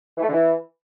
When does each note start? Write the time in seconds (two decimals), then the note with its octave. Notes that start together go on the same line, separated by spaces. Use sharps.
0.17 E3
0.23 A3
0.28 D3
0.33 E3